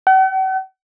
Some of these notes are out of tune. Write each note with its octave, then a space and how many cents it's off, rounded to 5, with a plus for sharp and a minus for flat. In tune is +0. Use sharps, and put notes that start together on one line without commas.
F#5 +45